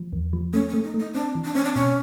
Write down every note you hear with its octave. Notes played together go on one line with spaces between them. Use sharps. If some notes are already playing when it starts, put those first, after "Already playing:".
Already playing: F3
E2
F3
A3 C#4
C#4
A3
D#4
A3
D#4
C4 D4
E3
D4
C4 C#4
D4
B2 C#4